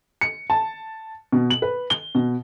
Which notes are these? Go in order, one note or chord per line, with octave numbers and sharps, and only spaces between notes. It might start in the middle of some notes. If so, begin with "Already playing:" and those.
C#7
A5
B2
F#7
B4
G7
B2